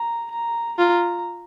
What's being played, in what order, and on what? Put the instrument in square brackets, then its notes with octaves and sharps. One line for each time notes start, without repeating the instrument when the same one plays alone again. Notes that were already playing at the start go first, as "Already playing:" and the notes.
Already playing: [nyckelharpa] A#5
A#5
[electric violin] F4 [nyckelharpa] A#5